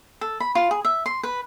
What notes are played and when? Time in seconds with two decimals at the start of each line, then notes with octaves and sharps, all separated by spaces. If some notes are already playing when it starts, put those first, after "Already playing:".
0.21 A4
0.40 B5
0.55 F4
0.71 G#4
0.85 E5
1.06 C6
1.23 B4